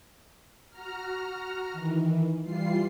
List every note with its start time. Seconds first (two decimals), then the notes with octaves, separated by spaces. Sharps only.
0.70 F#4 A#5 F6
1.72 D#3 E3
2.43 E3 G3 F4 C7